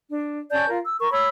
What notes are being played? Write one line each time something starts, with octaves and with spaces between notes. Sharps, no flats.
D4
C#4 D5 A5 G6
F4 A#4
E6
A#4 C#6
C#5 B5 E6